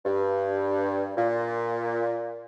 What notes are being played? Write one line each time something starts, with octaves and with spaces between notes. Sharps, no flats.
G2
A#2